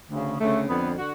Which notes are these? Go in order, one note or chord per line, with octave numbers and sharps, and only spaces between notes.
D2 C#3
D2 C#3 A3
F2 D3 B3
D3 F#4